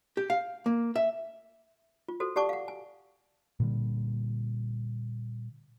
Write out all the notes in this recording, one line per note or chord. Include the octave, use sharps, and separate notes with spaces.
G4
F5
A#3
E5
F4
F#4 A4 C5
G4 D5 F#5 A5 C#6 D6
F5 F#5
G#5
A#2 D3 G3